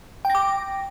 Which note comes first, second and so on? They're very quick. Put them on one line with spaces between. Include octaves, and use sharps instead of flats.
G5 A#6 D6